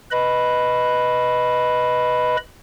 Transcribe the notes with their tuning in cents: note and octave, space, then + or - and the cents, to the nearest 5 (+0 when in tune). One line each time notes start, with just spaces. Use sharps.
B4 +0 D#5 +0 B5 +0